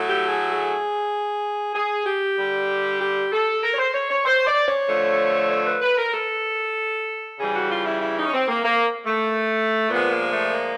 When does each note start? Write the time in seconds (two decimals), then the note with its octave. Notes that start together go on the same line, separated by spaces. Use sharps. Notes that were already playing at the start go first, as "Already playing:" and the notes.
Already playing: A2 F#3 A3
0.08 G4
0.28 G#4
0.50 G#4
1.75 G#4
2.06 G4
2.37 D3 G3
3.00 G4
3.32 A4
3.63 A#4
3.73 C#5
3.78 C5
3.94 C#5
4.10 C#5
4.25 C5
4.47 D5
4.67 C#5
4.87 D3 F3 A3
5.51 C#5
5.66 B4
5.82 B4
5.98 A#4
6.13 A4
7.38 C#3 E3 G3 G#4
7.54 F#4
7.70 F4
7.85 E4
8.01 E4
8.17 D#4
8.26 C#4
8.33 C4
8.48 A#3
8.64 A#3
9.06 A3
9.89 A#2 F3 G#3 B3
10.11 A#3
10.31 A3
10.52 A#3